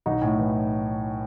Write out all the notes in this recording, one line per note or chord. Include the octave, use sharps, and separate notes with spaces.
B1 D#4 F#4
A2
E3